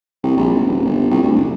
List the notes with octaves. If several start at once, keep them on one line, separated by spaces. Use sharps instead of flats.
C2
A#1
G#1
D#1
G1
C2
D2
F#1